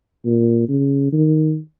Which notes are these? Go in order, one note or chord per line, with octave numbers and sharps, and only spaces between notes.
A#2
C#3
D#3